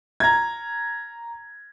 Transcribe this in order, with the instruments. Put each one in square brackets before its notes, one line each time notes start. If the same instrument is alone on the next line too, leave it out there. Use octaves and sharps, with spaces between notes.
[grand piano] A#5 G#6